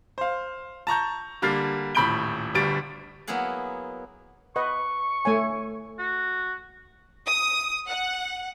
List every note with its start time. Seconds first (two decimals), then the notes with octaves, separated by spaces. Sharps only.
0.18 C5 F5
0.87 A5 A#5 C#6 G6
1.42 D3 G3 A#3 F6 A6 C7
1.95 D#1 A2 B5 G6 D7 G7
2.55 G1 D2 G3 A6 D7
3.27 F#3 A#3 B3 E4 G#4 F#5
4.56 B4 D#5 F#5 C#6
5.25 A3 C#5 G#5
5.99 F#4
7.25 D#6
7.88 F#5